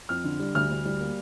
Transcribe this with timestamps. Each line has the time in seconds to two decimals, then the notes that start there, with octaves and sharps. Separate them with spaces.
0.09 F2 F6
0.24 D3
0.40 G3
0.55 D2 F6
0.70 D2
0.85 G3
1.00 A#3